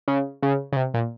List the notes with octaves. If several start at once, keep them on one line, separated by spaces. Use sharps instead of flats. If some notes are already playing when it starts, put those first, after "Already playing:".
C#3
C#3
C#3
C3
A#2